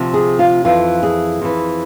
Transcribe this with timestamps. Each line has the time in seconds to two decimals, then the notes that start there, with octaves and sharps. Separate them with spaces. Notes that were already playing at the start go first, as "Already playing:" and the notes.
Already playing: D2 C3 F3
0.14 G#4
0.39 F4
0.65 F2 E3 F4
1.03 G#4
1.41 F2 E3